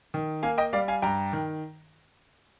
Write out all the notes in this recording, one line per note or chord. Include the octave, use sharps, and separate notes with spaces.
D#3
A#3 F5 G#5
D#5 G5
G3 D5 F5
F5 G#5
G2 G5 A#5
D#3